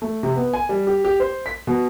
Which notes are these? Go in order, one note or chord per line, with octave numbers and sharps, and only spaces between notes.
A3
C3
B3
G#5
G3
G4
G4
C5
B6
B2